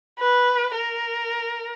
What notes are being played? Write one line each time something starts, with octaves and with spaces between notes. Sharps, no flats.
B4
A#4